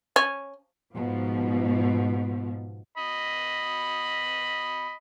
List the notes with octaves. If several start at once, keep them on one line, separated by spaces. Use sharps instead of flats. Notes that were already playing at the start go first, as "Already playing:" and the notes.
C#4
G#2 B2 F3
D#5 B5